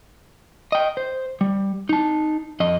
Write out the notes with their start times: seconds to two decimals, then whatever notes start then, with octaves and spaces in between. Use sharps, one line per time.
0.72 D#5 G5
0.97 C5
1.41 G3
1.89 D#4 A5
2.60 F2 D#5